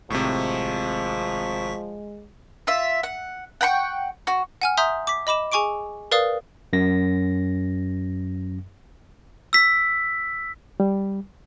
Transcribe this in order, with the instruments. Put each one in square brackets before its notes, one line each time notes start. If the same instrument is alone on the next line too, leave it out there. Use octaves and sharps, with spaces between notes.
[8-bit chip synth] G#1 C#6 B6 [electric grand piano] A2 C3 [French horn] F3 [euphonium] G#3
[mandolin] F4 E5
F#5
F#5 G5 B5 C#6
F#4
[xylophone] F#5 G#5 F6
E5 A#5 C6 D#6 G6
D6 B6
D#5 B5 D6 E7
G#4 G#5 C#6 D6 D7
A#4 B4 D5 F5 D#6
[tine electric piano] F#2 A#6
[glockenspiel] E6 B6
[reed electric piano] G3